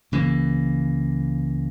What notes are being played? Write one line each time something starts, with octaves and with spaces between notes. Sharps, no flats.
C#2 C#3 E3 A#3